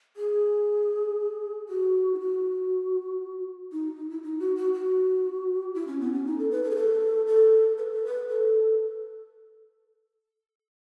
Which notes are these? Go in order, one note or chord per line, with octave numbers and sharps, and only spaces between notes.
G#4
F#4
E4
F#4
D#4
D#4
E4
D#4
F#4
F#4
F#4
E4
C#4
B3
C#4
D#4
A4
B4
A4
G#4
A4
A4
B4
A4
B4
A4